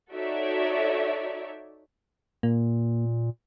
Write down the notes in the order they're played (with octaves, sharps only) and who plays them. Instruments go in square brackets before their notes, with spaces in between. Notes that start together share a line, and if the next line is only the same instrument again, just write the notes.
[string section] D#4 F#4 A4 C#5 D5 E5
[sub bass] A#2 [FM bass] A#3